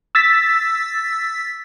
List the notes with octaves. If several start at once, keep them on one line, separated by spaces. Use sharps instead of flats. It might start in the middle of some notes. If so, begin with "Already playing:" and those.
E6 A6 B6